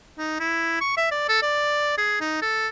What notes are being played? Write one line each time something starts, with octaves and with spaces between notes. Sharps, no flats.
D#4
E4
C#6
E5
D5
A4
D5
G#4
D#4
A4